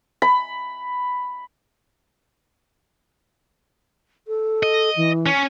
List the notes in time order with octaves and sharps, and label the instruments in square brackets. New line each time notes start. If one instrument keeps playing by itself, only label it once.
[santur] B5
[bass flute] A4
[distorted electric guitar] D#5
[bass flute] E3
[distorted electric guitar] C#4